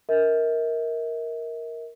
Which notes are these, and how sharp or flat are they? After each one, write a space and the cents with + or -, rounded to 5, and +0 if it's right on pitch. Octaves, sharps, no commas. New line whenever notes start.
A#4 +0 E5 -45